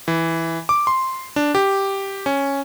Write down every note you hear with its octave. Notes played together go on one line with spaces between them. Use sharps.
E3
D6
C6
D4
G4
C#4